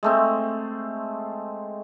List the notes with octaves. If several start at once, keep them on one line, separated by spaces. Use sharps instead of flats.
G#3 A3 C4